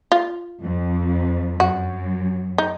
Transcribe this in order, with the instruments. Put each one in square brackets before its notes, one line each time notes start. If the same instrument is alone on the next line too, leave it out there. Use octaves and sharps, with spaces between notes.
[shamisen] F4
[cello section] F2
[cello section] F#2 [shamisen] F#4
[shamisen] D#4